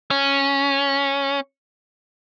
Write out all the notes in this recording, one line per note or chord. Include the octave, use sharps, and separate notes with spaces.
C#4